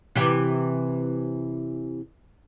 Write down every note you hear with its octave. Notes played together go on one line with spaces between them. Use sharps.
C3 E3 G4